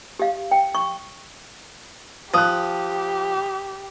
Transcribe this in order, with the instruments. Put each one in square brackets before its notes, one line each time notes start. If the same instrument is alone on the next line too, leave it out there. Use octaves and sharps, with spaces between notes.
[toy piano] G4 F5
G5
C#6
[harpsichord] F3 [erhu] G4 [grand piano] D#6 F#6